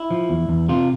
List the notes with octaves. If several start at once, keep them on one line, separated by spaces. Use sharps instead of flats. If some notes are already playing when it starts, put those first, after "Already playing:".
Already playing: E4
F3
E2
E2
C3 F4